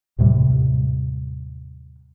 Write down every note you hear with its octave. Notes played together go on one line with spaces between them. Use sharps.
D#2 A2 C3 G3